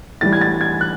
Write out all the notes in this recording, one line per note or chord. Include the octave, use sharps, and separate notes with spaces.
A2 E3 G3 A6
G#6
A6
G#6
F#6